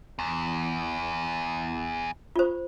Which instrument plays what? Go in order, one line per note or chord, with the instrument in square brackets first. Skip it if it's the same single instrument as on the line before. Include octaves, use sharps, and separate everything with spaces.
[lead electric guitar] E2
[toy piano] F4 C5